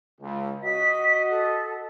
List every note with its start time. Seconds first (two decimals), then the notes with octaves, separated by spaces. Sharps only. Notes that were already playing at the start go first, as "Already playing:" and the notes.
0.21 C#2
0.63 F#4 D#5 B6
1.30 A4